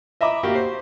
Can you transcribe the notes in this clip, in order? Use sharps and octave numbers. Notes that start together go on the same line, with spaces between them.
D#5 E5 A#5 B5 D6
A#3 F#4 G4
C5